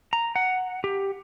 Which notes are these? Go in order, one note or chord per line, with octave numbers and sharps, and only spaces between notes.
A#5
F#5
G4